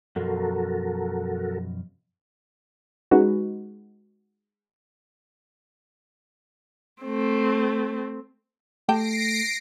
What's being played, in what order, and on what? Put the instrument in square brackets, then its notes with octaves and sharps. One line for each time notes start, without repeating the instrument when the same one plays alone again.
[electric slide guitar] F#2 B2 F3 [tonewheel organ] F#4 A4 A#4
[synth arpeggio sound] G#3 C#4 D#4 F#4 B4
[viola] A3 C4
[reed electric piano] A3 [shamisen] G4 G5 A5 [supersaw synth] A#6 C7 D7